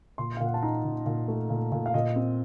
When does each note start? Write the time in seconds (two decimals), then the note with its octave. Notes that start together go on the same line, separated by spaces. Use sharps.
0.18 A#2 C6
0.37 F5
0.40 A#2
0.46 F#5
0.54 A5
0.63 D#4 A#5
0.84 A#2
1.06 A#2
1.28 A3
1.50 A#2
1.72 A#2
1.86 F5
1.94 A#2 D#5
2.16 C4